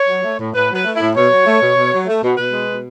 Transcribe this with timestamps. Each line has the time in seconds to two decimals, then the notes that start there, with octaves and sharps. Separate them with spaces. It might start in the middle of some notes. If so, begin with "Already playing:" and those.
Already playing: C#5
0.08 F#3
0.23 A3
0.39 A2
0.54 A2 B4
0.70 F#3 B4
0.84 A3
0.95 E4
1.00 A2
1.15 B2 C#5
1.31 F#3
1.46 A3
1.61 B2
1.77 B2
1.92 F#3
2.06 A3
2.22 B2
2.37 B2 B4
2.52 G#3
2.68 B2